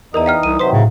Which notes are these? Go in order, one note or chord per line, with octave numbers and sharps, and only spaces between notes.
E2 E3 D#4 A#4 D5 A#5 D#6
F5 G5 F6
C2 D#7
C3 D#3 F#3 B4 C5 D#6 B6
A2 C#3